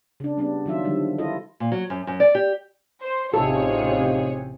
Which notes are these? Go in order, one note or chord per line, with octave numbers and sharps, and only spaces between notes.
C#3 D4
G3 B3 D4
D#3 F#3 F4 E5
D3 D#3 F3 G3
E4 F4 A4 D#5
A#2
F#3
F#2
F#2
D5
G4
C5
A1 C3 F3 D#4 F4 G#4 A4 C#5